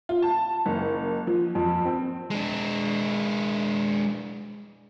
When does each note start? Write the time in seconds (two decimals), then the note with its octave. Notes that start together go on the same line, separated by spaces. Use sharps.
0.09 F4
0.22 A5
0.66 F#1
1.27 F3
1.55 F2
1.85 C4
2.30 G#3 D4